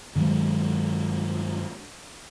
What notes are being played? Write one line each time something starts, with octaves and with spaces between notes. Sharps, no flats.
G2 D#3 F#3 G#3